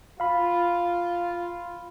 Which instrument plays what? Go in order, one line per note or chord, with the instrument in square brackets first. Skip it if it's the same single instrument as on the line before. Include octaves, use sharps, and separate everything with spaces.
[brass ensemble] F4 [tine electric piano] F5 B5